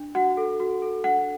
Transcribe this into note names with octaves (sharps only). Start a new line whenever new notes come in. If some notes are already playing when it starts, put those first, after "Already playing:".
Already playing: D4
F#4 F#5
A4
F#4
A4
D4 F#5